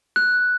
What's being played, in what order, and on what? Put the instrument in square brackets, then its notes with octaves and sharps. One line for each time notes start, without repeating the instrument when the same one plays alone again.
[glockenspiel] F#6